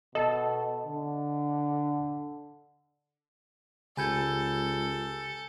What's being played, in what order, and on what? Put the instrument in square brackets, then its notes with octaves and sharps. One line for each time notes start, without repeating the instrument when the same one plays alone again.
[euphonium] B2 [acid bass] A4 [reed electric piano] D#5 A5
[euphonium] D3
[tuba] C#2 [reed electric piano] C#3 G4 B5 [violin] A4 [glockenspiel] G#5 G6 G#6